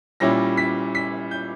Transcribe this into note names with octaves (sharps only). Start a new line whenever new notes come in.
A#2 G3 C#4 E4 A#6
B6
B6
G6